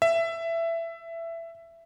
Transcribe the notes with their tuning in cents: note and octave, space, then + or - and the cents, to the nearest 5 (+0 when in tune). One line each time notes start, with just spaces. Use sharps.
E5 +15